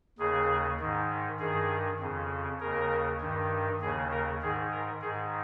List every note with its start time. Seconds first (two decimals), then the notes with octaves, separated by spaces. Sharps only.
0.18 D#2 C#3 G#4
0.80 G#2 D#3
1.39 G2 D#3 G#4
2.00 F2 C#3
2.60 D#2 C#3 A#4
3.20 G2 D#3
3.81 D#2 C#3 G#4
4.11 A#4
4.41 G#2 D#3 G#4
4.71 A#4
5.01 G#2 D#3 G#4